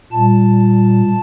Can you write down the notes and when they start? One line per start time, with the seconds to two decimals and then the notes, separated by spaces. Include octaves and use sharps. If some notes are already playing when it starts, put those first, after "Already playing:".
0.12 A#2 G3 A5